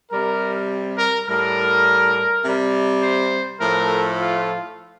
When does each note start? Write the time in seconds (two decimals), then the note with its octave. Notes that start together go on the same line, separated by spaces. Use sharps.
0.12 C3 G3 A#4
0.98 A#4
1.27 A2 G3 A#4
2.44 C3 G3
3.02 C5
3.59 A2 F3 A3 A#4
4.18 F4